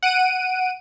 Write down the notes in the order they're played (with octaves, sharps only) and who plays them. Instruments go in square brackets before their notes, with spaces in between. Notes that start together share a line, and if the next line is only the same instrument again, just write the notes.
[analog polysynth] F#5 D7 D#7